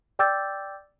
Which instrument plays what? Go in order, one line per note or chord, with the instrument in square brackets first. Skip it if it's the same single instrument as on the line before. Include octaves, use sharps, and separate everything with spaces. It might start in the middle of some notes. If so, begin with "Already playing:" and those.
[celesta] D5 G5 D6 E6 G6 A6